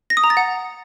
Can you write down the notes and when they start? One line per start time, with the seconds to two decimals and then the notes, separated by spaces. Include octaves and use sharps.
0.10 A#6
0.17 D#6
0.24 A#5
0.30 A6
0.37 F#5